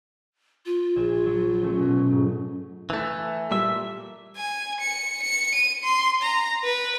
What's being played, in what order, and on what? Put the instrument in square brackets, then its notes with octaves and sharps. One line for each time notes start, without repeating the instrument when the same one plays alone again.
[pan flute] F4
[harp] A#1 G#6 E7
F#3
F#3 A3 C#4
B2
G#2
[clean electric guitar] E3 A3
[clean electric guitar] A#2 E5 [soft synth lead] G3
[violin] G#5
C#7
C#7
D#7
C6
A#5
B4